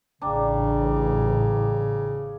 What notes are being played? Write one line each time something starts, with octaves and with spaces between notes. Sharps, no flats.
A1 C#3 D4 G5 A#5 D6